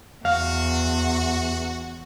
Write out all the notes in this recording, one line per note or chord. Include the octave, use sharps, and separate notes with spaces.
E2 F#4 F5